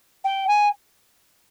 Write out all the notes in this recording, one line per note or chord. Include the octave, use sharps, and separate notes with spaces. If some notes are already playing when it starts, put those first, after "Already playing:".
G5
G#5